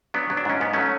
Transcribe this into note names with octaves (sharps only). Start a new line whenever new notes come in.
F#3 B3 D4
F#3
D4
G#2 C#4
G#2 B3
F#3 A3 C#4